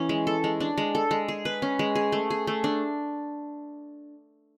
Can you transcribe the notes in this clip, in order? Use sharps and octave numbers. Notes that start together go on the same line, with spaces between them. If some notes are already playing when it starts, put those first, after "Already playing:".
Already playing: E3 C#4
G#3
A4
G#3
D4
G#3
A4
G#3
G#4
B4
C#4
G#3
G#4
A3
G#4
A3
D4